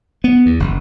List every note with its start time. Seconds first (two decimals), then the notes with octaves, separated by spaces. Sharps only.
0.24 B3
0.46 E2
0.60 F#1